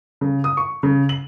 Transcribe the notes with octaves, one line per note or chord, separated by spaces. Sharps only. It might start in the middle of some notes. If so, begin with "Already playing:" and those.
C#3
D#6
C#6
C#3
F#7